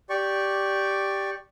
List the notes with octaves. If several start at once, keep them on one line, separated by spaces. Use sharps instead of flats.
G4 D5 C#6